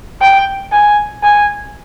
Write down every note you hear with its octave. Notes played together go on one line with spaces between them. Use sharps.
G5
G#5
G#5